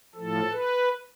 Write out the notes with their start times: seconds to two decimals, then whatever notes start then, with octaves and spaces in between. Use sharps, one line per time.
0.15 A2 F3 A4
0.51 B4